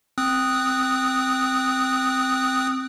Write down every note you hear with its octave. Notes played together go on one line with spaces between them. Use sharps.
C4 D#6 F#6